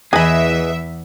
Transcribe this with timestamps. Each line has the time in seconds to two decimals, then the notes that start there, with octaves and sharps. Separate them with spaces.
0.13 E2 E3 G#4 B4 D#5 E5 G#5 B5